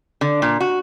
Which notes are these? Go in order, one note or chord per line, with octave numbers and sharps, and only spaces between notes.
D3
A#2
F#4